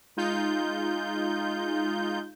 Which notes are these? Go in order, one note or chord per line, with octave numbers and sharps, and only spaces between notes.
G#3 D#4 F4 G6